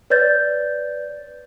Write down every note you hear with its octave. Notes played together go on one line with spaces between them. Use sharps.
B4 C#5 D5 G6 A6